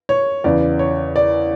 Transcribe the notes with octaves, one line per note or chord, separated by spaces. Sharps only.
C#5
E2 C#3 E3 D5
C#5
D5